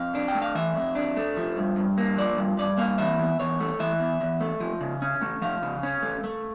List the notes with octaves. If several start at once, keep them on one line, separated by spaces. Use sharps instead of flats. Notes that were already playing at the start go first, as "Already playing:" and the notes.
Already playing: F2 F5
D4
G5
A3
F5
E3 E5
F2
D4
A3
F3
G2
G2
A#3
F3 D5
G2
G2 D5
A#3 F5
E3 E5
E2
E2 C#5
A3
E3 E5
E2
E2
A3
F3
C#3
C#4
A3
F3 F5
C#3
C#4
A3
A3